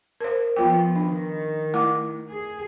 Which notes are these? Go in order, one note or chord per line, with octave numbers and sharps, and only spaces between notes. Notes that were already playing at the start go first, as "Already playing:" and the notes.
A#4 C5
F3 B3 F4 G5
D#3 D4
A3 E4 D6
G#4